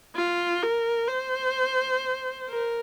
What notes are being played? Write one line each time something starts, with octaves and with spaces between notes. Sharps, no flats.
F4
A#4
C5
A#4